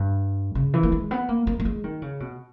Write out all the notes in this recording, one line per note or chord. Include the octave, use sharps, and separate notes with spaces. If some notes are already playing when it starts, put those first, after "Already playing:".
Already playing: G2
C#3
E3
A#3
G#3
B3
A#3
A#3
A#3
G#3
D#3
C#3
B2